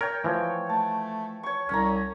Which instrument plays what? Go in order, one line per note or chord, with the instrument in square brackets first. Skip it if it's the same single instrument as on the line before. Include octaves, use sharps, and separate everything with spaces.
[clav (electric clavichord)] A#4 [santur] C#5 G5
[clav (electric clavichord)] E3 F3 [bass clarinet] A3
[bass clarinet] A3 [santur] A5
[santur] C#5 C#6
[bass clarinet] C2 [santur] C#4 A#5